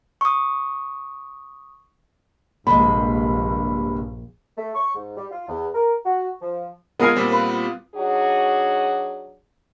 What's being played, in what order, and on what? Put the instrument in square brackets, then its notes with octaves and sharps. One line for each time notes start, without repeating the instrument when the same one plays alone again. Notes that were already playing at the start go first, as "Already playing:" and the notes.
[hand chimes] C#6 D#6
[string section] A#1 [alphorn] G2 [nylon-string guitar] C3 G#3 [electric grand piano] B5
[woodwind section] A3
C#6
G#2
G3
F4
E2
A#4
F#4
F3
[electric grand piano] G#3 D#6 C7 [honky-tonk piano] B3 F4 [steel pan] A#4 G#5
[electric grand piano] A#2 G3 C4
[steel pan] B4
[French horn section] F#3 D4 D#4 F#4 G#4